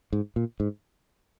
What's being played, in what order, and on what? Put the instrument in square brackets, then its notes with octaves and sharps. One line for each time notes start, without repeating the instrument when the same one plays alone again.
[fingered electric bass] G#2
A#2
G#2